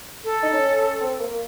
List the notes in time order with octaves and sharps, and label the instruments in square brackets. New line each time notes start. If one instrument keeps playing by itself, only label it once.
[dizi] A4
[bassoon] D#4
C#4
C4
A#3